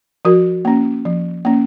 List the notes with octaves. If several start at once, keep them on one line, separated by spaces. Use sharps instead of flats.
F3 F#4 A#4
A#3 C#4
F3
A#3 C#4